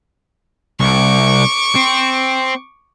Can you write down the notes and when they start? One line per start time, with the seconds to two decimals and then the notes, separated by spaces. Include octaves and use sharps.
0.80 C2 C#6 D6
1.75 C4